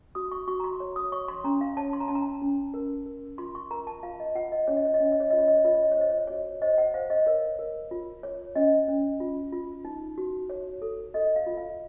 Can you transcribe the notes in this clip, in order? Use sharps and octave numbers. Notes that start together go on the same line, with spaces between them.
F#4 D#6
C#6
F#4 C#6
A#5
C6
C#5
D#6
C#5 C#6
C6
C#4 A#5
F5
C#5 A5
C6
A#5
C#4 A5
A#5
C#4
A#4
A#4
F4 C6
C#6
A#4 A#5
A5
F4 F5
D#5
F4 F#5
D#5
C#4 C#5
D#5
C#5
D#5
C#4 C#5
D#5
C#5
F4 D#5
C#5
D#5
C#5
F4 D#5
C#5
D#5
C#5
C5 D#5
C#5
D#5
F#4 C#5
C5 D#5
F#5
C5 F5
D#5
A#4 C#5
A#4
F4
C#5
C#4 D#5
C#4
F4
F4
D#4
F#4
C#5
A4
A4 D#5
F5
F4
F5